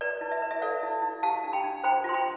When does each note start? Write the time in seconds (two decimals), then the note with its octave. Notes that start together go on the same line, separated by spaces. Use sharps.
0.01 B4 D5
0.21 E4
0.32 E5
0.42 B4
0.51 E5
0.62 A4 D5 F5
0.83 E4
1.02 E4
1.23 G4 F5 A5
1.44 D4
1.53 G5 B5
1.64 D4
1.84 C5 G5 B5
2.04 F4 C6
2.14 G5 B5